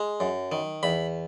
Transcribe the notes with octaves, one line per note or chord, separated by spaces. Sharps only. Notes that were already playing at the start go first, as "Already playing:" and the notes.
Already playing: G#3
F#2
D#3
E2 B5